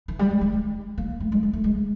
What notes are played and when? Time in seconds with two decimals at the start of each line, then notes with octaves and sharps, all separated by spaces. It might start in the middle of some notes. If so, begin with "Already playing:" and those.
0.08 E3
0.19 G3
0.31 G#3
0.41 G#3
0.53 G#3
0.98 A#3
1.20 A3
1.32 G#3
1.43 G#3
1.53 A3
1.64 G#3